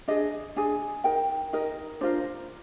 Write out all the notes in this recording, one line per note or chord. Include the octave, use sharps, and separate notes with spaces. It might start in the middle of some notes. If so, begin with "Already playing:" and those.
D4 G#4 D#5
D4 G#4 G#5
D#4 A#4 G5
D#4 A#4 D#5
D4 F4 A#4 C5